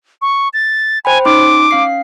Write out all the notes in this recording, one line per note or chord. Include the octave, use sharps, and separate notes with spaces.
C#6
A6
C5 G5 G#5 B5
C#4 D#4 C6 D6
C#4 F5 C7